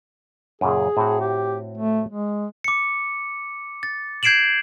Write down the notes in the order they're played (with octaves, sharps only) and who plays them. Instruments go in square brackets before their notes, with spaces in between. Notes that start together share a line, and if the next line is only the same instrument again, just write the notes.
[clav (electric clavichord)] F#2 A#2 C#3 [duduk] G#4
[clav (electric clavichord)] A2 C4 F#4
[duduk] G4
A3
G#3
[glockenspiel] D6 C#7
A6
G6 G#6 C7 D7 E7 F#7